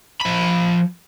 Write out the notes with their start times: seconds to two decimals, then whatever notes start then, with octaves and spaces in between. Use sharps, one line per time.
0.21 F3 B5